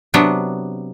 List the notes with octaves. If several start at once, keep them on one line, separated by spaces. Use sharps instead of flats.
C3 F#3 B3 D4